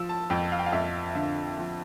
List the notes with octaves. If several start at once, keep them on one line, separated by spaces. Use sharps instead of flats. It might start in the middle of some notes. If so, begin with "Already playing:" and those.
Already playing: F3 E6
A5
F2 G5
F5
G5
F5
F2 E5
D3 E5
F3